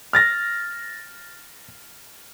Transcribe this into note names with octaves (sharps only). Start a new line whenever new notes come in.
F6 A6 A#6